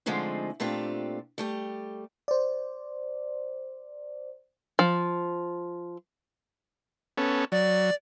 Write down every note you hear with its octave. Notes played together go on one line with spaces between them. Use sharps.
D3 F3 G#3 A3 C4 D#4
A#2 A3 C4 D4 F4 G4
G3 A3 G4
C5 D5
F3
B3 C#4 A4
F#3 D5